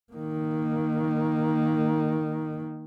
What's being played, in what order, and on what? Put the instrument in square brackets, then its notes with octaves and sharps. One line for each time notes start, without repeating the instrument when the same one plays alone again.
[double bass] D#3 A#3